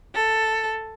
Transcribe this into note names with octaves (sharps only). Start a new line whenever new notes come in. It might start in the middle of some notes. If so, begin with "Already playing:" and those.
A4